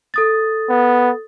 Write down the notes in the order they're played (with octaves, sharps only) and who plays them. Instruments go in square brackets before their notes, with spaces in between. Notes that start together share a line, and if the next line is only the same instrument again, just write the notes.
[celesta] A4 D#6 A6
[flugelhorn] B3